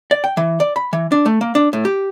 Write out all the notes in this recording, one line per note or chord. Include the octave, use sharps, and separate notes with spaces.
D5
G5
E3
D5
B5
E3
D4
A3
A#3
D4
A2
G4